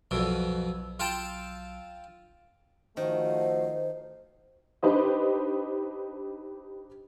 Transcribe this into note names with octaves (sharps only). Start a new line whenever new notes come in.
B1 F2 B2 F#3 E6
F4 G5 A5
D#3 F3 A3 F#4 C5
D4 D#4 G4 B4 C5 D#5